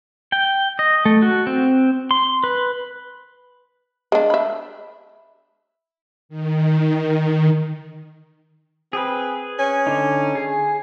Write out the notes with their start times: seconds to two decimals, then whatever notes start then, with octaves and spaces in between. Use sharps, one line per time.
0.32 G5
0.79 D#5
1.05 A3
1.22 F#4
1.47 C4
2.11 C6
2.44 B4
4.12 G#3 D4
4.30 E5 B5
6.29 D#3
8.93 C4 G#4 B4
9.59 C#4
9.87 D3 D#4
10.35 G#4